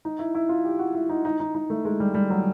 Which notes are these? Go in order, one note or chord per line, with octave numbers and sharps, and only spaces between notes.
D#4
E4
E4
F4
G4
F#4
E4
D#4
D#4
D#4
D#4
A3
G#3
G3
G3
F#3